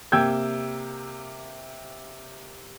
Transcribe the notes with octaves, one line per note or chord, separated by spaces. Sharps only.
C3 A#3 G5 E6 G6 G#6